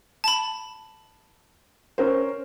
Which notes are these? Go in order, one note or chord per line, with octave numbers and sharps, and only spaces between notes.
A5 B5
C#4 A#4 C5